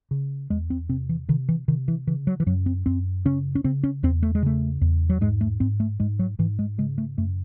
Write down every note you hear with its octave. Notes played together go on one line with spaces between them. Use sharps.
C#3
E2 G#3
C4
C3 C4
E3
C3 D#3
E3
C3 D#3
E3
C#3 E3
F#3
E3
F#2 F#3
C4
F#2 C4
C#3 C#4
C#4
C#3 C4
C#4
E2 C4
A3
G#3
C#3 A3
E2
F#3
G#2 G#3
A3
G#2 C4
A3
G#2 G#3
F#3
G#2 E3
G#3
C#3 G#3
A3
F#2 A3